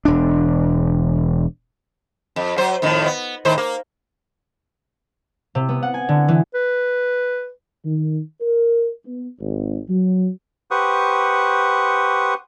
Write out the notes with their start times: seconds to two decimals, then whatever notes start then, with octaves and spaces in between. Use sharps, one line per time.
0.05 E1 D4
2.36 F2
2.58 F#3 C5
2.82 F2 A2 D#3
3.06 B3
3.45 A2 D#3 C5
3.58 A#3
5.55 C3
5.69 B3
5.83 F#5
5.94 G#5
6.09 D3
6.28 E3
6.54 B4
7.85 D#3
8.41 A#4
9.05 B3
9.40 G#1
9.88 F#3
10.71 G4 B4 C5 F#5 C#6 D#6